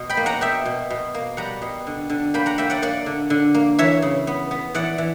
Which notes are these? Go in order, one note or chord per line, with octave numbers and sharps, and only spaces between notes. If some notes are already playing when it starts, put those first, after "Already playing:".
Already playing: B2
G5 B5
A#3
F#5 A#5
B2 E5 G5
B2
B2
A#3
G3 F#5 A#5
B2
D3
D3
A#3 G5 B5
F#5 A#5
A#3 E5 G5
D5 F#5
A#3 D5 F#5
D3
D3
A#3
E3 C#5 E5
C#3
B3
B3
E3 D5 F#5
E3